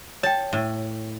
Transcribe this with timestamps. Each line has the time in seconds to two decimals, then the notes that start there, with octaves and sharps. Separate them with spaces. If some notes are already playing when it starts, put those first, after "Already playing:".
0.23 C#5 G5 A5
0.53 A2